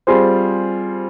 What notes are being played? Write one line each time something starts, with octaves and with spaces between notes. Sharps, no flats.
G3 C4 F4 G#4 C5